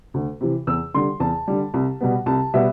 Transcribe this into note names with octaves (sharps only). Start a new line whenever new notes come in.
D2
C3 E3
E2 E6
D3 G3 C6
E2 A5
D3 G3
C2
B2 G3 B3
C2 A5
B2 G3 B3 E5